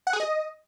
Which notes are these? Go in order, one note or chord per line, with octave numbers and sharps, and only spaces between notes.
F#5
G#4
D#5